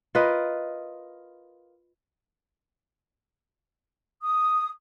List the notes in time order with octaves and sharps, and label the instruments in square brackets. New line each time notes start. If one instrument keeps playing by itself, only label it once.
[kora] F4 A#4 B4 D#5
[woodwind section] D#6